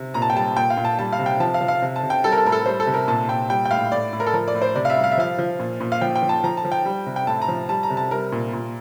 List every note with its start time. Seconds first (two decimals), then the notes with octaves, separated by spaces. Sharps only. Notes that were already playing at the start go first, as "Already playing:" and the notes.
Already playing: C3
0.14 A#2 A#5
0.22 A5
0.30 G5
0.35 G3 A5
0.56 A#2 G5
0.70 F5
0.77 A#2
0.85 A5
0.99 G3 A5
1.12 F5
1.19 C3
1.26 G5
1.40 F3 A5
1.54 F5
1.61 F3
1.68 F5
1.82 C3
1.96 A5
2.03 C3
2.10 G5
2.23 G3 A4
2.32 A#4
2.38 A4
2.45 A2 A#4
2.52 A4
2.66 G3 C5
2.80 A4
2.87 C3
2.94 A#4
3.08 A#2 A5
3.28 A#2 G5
3.49 G3 G5
3.65 G5
3.71 A2 F5
3.92 A2 D5
4.13 A2
4.20 A#4
4.27 A4
4.33 F3 A#4
4.48 D5
4.55 A2
4.62 C5
4.75 C3 D5
4.85 F5
4.90 E5
4.96 G3
5.04 F5
5.11 E5
5.18 F3 F5
5.39 F3
5.59 A#2
5.80 A#2
5.92 F5
6.01 F3 G5
6.16 G5
6.23 F3
6.29 A5
6.44 F3 A#5
6.57 A5
6.65 F3
6.72 G5
6.85 G3
7.06 C3
7.16 G5
7.27 A2 A5
7.42 A#5
7.48 F3
7.69 G3 A5
7.83 A#5
7.90 C3
7.97 A5
8.11 G3 A#4
8.32 A#2
8.53 A#2